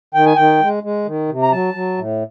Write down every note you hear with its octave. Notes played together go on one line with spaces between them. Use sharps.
D#3 G5
G#5
D#3 G5
G#3
G#3
D#3
C3
A#5
F#3 A5
F#3
A2